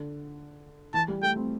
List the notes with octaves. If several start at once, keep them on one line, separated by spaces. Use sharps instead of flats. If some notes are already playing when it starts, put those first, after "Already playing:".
Already playing: D3
E3 A5
G3
A3 G5
C4